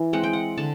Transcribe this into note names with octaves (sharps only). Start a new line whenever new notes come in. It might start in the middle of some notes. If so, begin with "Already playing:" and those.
Already playing: E3
G#3 C4 F#5
G5
F#5
D3 A5